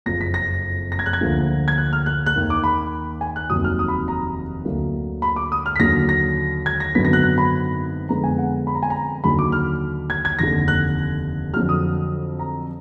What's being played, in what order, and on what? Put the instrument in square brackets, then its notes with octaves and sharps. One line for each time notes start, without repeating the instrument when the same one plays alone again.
[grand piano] F#1 F2 F3 A#6
B6
A#6
A#6
G#6
F#6
G#6
D2 D3 F3 A#3
G#6
F#6
F6
F#6
F#6
D#2 D#3 A#3
D6
B5
G#5
F#6
F1 D#2 D#3 F#3 D#6
F6
D#6
B5
A#5
D2 D3 F#3 A#3
B5
D6
D#6
F6
B6
D#2 D3 F#3 A#6
A#6
G#6
A#6
G#1 F#2 D3 F#3 B3 B6
A#6
F#6
F#6
B5
F2 D3 G#3 B3 A#5
G#5
F#5
B5
A#5
G#5
A#5
D#2 D3 F#3 B5
D6
F6
G#6
G#6
F1 D#2 D3 A#6
F#6
F#3 F6
F2 D3
D#6
A#5